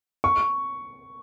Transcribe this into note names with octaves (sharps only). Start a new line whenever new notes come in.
C#6